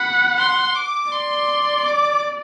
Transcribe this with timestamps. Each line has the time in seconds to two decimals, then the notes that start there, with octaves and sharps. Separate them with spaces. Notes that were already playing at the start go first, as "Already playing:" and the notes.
Already playing: F#5 B5
0.38 C6
0.75 D6
1.12 D5 C6
1.86 D6